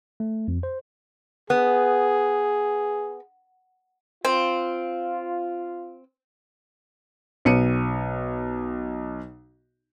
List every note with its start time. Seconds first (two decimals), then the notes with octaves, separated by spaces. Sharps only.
0.20 A3
0.48 F2
0.63 C5
1.50 B3 G#4
4.25 C4 F4
7.45 B1 C#7 D#7